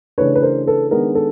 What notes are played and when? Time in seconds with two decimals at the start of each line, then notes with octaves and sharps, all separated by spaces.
0.18 C#3 E3 A3 D4 B4 C#5
0.35 B4
0.42 A#4 C5
0.67 A4 B4
0.91 D#3 G#3 B3 D4 A#4
1.15 A4